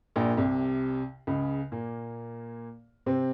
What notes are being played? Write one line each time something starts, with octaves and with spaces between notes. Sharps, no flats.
A#1 A#2
C2 C3
C#2 C#3
A#2 A#3
C3 C4